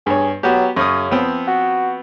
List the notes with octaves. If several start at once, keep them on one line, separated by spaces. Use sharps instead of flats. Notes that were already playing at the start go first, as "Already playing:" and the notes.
G2 G#4 C#5
F#3 B3 F#4 G4
F#2 C#3 C#4 D#6
F3 B3 C4
F#4